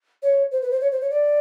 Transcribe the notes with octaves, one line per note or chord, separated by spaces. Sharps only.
C#5
C5
B4
C5
C#5
C5
C#5
D5